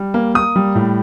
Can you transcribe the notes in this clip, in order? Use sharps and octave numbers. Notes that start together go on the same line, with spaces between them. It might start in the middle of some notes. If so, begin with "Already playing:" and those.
Already playing: G3
A#3
A#3 D#6
G3
A2